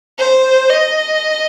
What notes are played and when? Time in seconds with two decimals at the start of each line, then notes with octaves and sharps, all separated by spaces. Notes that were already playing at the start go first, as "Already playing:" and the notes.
0.19 C5
0.70 D#5